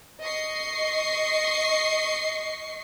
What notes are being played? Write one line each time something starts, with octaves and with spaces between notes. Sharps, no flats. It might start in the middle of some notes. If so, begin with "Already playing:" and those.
D#5 C#6 C7